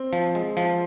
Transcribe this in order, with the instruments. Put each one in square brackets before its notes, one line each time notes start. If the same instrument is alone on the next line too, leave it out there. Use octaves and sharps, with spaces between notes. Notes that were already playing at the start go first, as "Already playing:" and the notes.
Already playing: [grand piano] C4
[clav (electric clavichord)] F3
G#3
F3